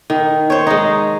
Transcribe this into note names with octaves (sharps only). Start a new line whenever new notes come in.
D#3
C5 C#5
G#3 D#4